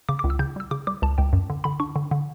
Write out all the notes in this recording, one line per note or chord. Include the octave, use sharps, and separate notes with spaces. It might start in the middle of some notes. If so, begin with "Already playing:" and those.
C#3 D6
D6
C#2
E6
C#3 G6
G3 E6
C#3 D6
G3 D6
C#2 A5
C#2 G5
F#2
D3
D3 B5
D4 C#6
D3
D3